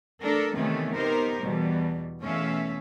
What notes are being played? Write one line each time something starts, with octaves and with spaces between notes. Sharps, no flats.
A3 D4 A4 A#4
C3 D#3 E3 A3 B3 C#4
B3 D#4 G4 A#4 C5
E2 B2 G3
E2 B2 A3 C#4 E5 F5